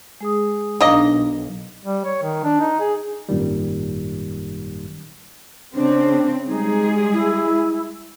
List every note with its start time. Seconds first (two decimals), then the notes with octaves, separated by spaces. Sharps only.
0.21 G#3 G#4 D#6
0.80 B1 A#3 D4 D#4 D#5
1.85 G3
2.05 C#5
2.22 D#3
2.44 D4
2.60 D#4
2.80 G#4
3.29 G#1 F#2 A#2 D#3 G3
5.75 C#3 C4 D4
6.47 G3 G#3 D#4 G#4
7.13 E4